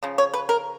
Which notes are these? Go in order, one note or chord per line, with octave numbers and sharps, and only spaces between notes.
C#3 F3
C#5
B4
A#4